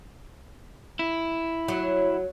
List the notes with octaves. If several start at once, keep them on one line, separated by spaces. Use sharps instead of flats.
E4
F#3